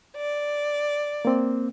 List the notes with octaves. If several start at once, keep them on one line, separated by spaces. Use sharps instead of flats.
D5
A#3 C4